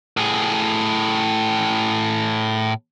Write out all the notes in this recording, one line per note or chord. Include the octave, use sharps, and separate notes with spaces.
A2 G#4